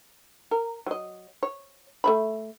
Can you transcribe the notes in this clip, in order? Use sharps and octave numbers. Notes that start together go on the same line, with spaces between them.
A#4
F#3 D#5
C#5
A3 E5 B5